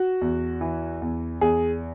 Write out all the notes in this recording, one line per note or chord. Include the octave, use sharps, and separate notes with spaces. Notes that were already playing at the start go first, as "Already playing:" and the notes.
Already playing: F#4
E2
E3
E2
E2 G#4